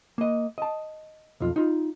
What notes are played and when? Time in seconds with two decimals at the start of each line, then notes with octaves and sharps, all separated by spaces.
0.18 A#3 D#5
0.58 D#5 A5
1.40 B1 F2 F4
1.56 D#4 F4